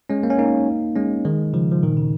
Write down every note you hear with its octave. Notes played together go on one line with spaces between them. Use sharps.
G#3 C#4
A#3
C#4
A#3 D#4
G#3 C#4
D#3 G#3
C#3 F3
F3
A#2 D#3
C#3